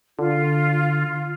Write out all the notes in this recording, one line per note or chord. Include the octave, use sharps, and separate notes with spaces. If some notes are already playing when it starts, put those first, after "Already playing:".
D3 F4